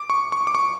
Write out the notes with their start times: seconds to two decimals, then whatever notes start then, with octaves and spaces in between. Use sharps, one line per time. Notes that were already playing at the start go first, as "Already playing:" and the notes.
Already playing: D6
0.10 C#6
0.32 C#6
0.47 D6
0.55 C#6